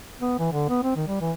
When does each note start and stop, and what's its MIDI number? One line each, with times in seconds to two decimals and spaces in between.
0.20 0.35 59
0.39 0.49 52
0.52 0.69 50
0.69 0.81 59
0.83 0.92 60
0.96 1.04 51
1.07 1.19 55
1.21 1.32 52